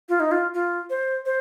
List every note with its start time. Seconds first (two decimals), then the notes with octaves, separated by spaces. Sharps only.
0.09 F4
0.20 D#4
0.31 F4
0.54 F4
0.90 C5
1.26 C5